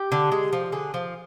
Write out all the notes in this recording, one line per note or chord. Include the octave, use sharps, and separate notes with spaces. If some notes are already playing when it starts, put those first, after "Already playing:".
Already playing: G4
D3
G#3
F3
D3 G#4
F3